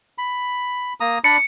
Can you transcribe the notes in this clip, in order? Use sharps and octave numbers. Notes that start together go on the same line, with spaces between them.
B5
A#3 A#5 D#6
D4 D5 B5 C#7